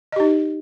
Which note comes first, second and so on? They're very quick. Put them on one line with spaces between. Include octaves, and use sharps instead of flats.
D#5 G4 D#4